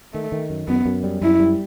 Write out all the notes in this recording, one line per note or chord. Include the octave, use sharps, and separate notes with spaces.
D#3 A3
D#3
F#2
F#2 B3
F#2
G3
F#2 E4
G3